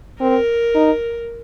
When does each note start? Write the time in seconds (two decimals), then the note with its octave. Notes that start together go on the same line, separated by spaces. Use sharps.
0.21 C4 A#4
0.75 D#4